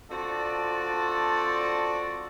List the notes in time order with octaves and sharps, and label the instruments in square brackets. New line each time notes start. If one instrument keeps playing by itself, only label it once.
[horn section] C4 D4 F4 F#4 A4 D5